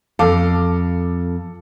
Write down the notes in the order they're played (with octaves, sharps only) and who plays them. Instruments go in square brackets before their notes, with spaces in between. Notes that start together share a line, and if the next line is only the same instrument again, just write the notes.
[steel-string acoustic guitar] F2 F5 [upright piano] A4 D6